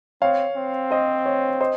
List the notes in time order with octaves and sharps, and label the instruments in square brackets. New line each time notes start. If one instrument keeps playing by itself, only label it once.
[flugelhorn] C4 [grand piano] C#5 F5
[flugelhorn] C4
[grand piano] C5 D#5
C#5
C5 D#5